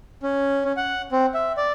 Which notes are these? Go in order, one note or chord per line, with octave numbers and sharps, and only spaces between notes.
C#4
C#4
F#5
C4
E5
D5